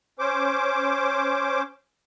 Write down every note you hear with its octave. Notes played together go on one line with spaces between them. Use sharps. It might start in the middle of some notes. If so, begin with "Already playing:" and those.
C#4 C5 D6